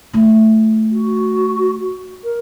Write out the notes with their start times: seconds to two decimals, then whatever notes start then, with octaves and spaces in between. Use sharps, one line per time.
0.13 A3 F4
0.91 F#4
2.24 A#4